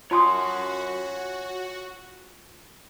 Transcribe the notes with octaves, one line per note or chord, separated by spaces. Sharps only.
F4 F#4 C#5 F#5 G#5 A5 C6 D#6